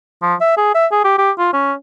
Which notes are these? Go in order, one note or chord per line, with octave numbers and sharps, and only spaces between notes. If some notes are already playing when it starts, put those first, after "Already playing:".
F3
E5
G#4
E5
G#4
G4
G4
F4
C#4